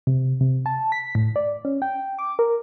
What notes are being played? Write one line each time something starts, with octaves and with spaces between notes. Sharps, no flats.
C3
C3
A5
B6
A2
D5
C#4
G5
D6
A#4